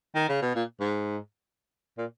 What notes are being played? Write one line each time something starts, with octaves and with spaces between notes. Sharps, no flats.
D#3
C#3
B2
A#2
G#2
A#2